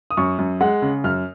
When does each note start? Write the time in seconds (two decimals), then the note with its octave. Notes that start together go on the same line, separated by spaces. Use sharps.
0.11 D#6
0.17 F#2 C#6
0.39 F#2
0.61 G#3 F#5
0.82 C#3
1.04 F#2 F6